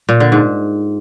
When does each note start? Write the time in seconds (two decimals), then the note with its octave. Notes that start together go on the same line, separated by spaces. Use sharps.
0.09 A#2
0.20 D3
0.32 G#2